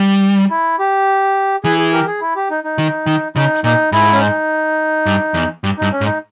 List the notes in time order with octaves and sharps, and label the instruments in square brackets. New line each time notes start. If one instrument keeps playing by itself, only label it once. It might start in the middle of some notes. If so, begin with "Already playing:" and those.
Already playing: [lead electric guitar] G3
[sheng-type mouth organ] E4
G4
[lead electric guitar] E3 [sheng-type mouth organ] G#4
[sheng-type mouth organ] G#4
G4 A#4
G#4
E4
G4
D#4
D#4
[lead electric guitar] D#3
D#3
[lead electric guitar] C#3 [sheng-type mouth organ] D#4
[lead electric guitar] A#2 [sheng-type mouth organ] D#4
[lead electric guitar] G#2 [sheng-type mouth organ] E4
[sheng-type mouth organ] C#4
D#4
[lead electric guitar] G2
E2
G2
[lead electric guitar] G2 [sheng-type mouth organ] D#4
[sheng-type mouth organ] C#4
[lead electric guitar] G#2
[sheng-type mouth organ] D#4